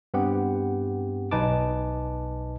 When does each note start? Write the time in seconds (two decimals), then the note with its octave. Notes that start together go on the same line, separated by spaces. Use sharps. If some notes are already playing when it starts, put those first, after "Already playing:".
0.14 G2 B3 C4 G4 F#5
1.31 B1 D#4 B4 G#5 A5 D6